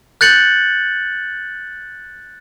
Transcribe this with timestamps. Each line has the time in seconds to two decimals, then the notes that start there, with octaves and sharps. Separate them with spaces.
0.21 F#6 G6 A6 C#7 F#7